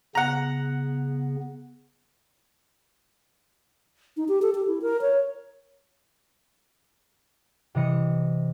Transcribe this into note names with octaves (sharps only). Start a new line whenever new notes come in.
C#3 B3 F#5 A#5
D#4
G4
A4
G4
E4
A#4
C#5
C3 E3 D#5 C#7